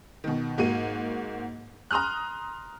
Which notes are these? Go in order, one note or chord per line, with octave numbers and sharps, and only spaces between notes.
B2 D#3
G#2 A#3 F#4 D#7
A#5 C6 D#6 F6 F#6